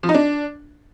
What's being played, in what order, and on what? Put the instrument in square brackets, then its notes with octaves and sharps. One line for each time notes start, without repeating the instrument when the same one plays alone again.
[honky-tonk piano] F3
D#4
D4